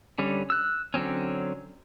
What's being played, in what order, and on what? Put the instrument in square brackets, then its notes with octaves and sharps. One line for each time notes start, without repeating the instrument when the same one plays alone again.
[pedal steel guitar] D3 G3 C#4
E6 F#6
D3 F#3 C4 C#4